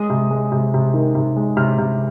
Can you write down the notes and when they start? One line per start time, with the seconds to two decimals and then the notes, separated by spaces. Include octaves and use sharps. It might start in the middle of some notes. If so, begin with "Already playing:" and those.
Already playing: G#3 D#6
0.10 C3
0.31 G#3
0.52 C3
0.74 C3
0.94 D#3
1.15 C3
1.36 G#3
1.57 C3 F6
1.78 C3